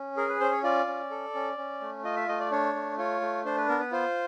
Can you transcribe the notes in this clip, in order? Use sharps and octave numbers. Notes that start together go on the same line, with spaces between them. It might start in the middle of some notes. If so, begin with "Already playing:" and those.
Already playing: C#4
G#4 A#4
B4
C#4 C5
C#5
F4 D5
C#4
A4
C#4
C#4
A3
F4 D#5
E5
A3 D#5
D5
D4 C#5
A3
F4 C#5
A3
D4 C5
B4
B3 A#4
B4
F4 C5